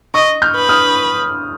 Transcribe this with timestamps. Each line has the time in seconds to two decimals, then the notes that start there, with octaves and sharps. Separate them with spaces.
0.14 D#5 C#6 D#6
0.42 F6 G6
0.55 B4
0.69 D#6 F6